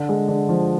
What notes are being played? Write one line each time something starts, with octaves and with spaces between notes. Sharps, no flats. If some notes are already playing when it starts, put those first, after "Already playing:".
Already playing: D3
G#3
D3
F3